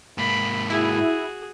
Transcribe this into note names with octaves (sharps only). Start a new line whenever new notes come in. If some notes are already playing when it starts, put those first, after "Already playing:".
G#2 A#3 B5
E4 F#4 G#4